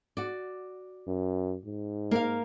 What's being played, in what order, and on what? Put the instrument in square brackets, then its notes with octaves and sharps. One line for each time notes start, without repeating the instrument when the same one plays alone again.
[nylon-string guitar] F#4 D5
[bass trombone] F#2
G#2
[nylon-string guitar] A#3 A#4 F5